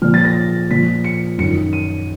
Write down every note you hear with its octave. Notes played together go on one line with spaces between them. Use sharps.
A#2 F3 F6
A6
A#6
A#2 F3 B6
C#7
F#2 D#3 C#7
D#7